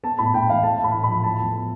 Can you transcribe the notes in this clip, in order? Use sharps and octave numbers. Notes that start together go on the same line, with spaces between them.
B3 A5
A2 B5
A2 G5
E3 F5
A3 A5
A2 B5
A2
B5
F3
A3 A5
E2